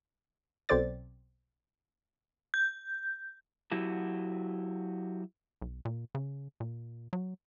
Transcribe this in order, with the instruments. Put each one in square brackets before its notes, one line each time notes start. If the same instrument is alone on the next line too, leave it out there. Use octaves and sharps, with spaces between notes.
[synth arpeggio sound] B1 C4 A4 C5 D5 A6
[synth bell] G6
[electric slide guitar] F#3 E4 F#4 G4
[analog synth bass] B1
A#2
C#3
A#2
F#3